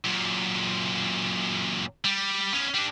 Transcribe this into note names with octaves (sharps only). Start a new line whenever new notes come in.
F#2 A#2
G3
B3 C#4
G3 D4